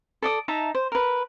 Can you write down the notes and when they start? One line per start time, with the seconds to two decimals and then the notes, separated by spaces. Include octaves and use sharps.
0.22 A4 D5 D#6
0.48 D#4 E5 A5 A#5
0.75 C5
0.92 A#4 B4